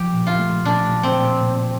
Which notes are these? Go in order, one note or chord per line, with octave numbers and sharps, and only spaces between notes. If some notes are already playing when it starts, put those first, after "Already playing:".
Already playing: F3 G4
A#2
F4
A3
A#2 D4
A#2
C4
A#2
A#2